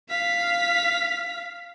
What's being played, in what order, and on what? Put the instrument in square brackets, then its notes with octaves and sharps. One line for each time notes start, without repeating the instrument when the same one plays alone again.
[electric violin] F5 B6